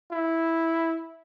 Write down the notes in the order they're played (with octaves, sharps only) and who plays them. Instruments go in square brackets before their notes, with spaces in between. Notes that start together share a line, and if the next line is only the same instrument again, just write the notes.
[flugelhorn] E4